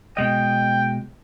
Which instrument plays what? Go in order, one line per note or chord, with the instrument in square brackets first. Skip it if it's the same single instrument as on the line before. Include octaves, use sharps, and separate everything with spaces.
[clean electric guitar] B2 G#3 D#5 [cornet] G5